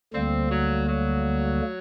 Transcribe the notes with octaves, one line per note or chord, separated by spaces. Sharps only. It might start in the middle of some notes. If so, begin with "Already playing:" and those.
D2 D3 G3 A#3 C4
F#3
F#3